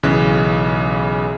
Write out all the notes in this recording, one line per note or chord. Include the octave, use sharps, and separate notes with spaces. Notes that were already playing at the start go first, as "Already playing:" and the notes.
B1 C#3 E3 F#6